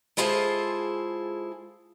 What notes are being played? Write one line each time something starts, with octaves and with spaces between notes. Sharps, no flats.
G#3 E4 F4 G#4 A4 C5